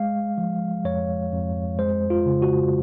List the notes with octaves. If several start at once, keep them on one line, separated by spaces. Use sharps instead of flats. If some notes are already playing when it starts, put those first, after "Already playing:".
Already playing: G#3 F5
F3
F2 C#5
F2
G#3 C5
F4
C#3
F#4